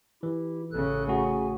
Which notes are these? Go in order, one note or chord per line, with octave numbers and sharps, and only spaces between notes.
E3 E4 G4
A1 C#3 A4 F#6
A3 F#4 G#4 G#5